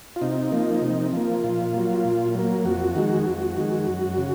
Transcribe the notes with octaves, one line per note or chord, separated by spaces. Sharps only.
F4
C3 D#4
F3 A#3
C3
F3 A#3
A#2 F4
F#3 A#3
A#2
F#3 A#3
F2 F#4
D#3 G#3
F2
D#3 G#3
F#2
C#3